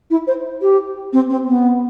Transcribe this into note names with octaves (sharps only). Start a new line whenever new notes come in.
E4
C5
G4
C4
C4
B3